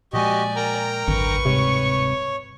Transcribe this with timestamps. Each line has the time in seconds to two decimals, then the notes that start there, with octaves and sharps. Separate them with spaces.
0.13 A#2 F3 G#3 F#4 G4 D5 D#5 G#5
0.56 A#4 G5 A#5
1.08 G#1 C#2 F#2 D3 B4 C#6
1.45 D1 G#2 C3 G3 C#5